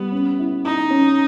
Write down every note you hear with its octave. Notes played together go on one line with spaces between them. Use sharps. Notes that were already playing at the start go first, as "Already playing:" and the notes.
Already playing: G3 B3
C#4
E4
D#4 E4
C#4